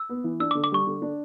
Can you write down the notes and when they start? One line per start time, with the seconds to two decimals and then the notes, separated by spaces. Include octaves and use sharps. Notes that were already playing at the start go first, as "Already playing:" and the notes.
Already playing: E6
0.09 B3
0.24 E3
0.40 D4 E6
0.51 D6
0.55 D3
0.64 D6
0.72 G3 C#6
0.87 D3
1.02 D4